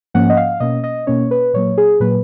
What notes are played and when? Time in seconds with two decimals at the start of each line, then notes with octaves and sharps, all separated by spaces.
0.14 G#2 F3 A#3 C#4 F#5
0.30 D#5
0.37 F5
0.60 B2 A#3 C#4 D#5
0.84 D#5
1.07 B2 A#3 C#4 C#5
1.31 B4
1.54 A#2 F#3 A#3 C#5
1.77 G#4
2.00 A#2 F#3 A#3 B4